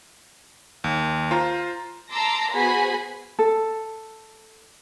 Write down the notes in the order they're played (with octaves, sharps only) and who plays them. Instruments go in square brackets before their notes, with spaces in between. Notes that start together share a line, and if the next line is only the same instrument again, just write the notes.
[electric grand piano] D#2
F4 C5 A#5
[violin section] A5 A#5 C6 D6 E6
B3 F#4 G#4 C5 G#5 B5
[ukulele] A4